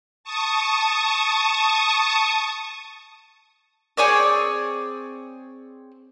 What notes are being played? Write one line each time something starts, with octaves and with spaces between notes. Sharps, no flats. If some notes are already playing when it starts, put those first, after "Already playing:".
A5 C#6 D#6
C4 G#4 C#5 D5